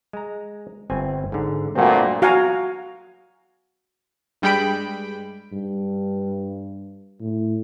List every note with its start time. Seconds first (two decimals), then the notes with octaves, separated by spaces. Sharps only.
0.13 G#3 A#5
0.90 G1 C4 G#5
1.32 G#2 D3
1.75 G2 A#2 A3 C4 F#4
2.22 F#4 F5 F#5 G#5 A#5
4.42 G2 G3 G#3 G5 B5 D7
5.52 G2
7.20 A2